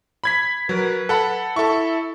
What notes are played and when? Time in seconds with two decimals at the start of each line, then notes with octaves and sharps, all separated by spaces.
0.24 B5 G#6 B6
0.69 F#3 A#4 B4
1.09 A4 F#5 B5
1.56 E4 A4 C#6